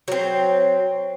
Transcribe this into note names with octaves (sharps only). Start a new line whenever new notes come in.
F#3 C4